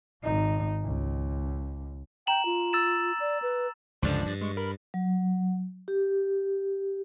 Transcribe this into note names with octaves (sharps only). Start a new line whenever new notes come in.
G#1 D#4
C#2
G5 A#5 E7 F#7
F4
E6 A6 E7
D5
B4
C#2 G2 D3 F3 D4 D5
G2
G#3 C#6
A#4 B5
F#3
G4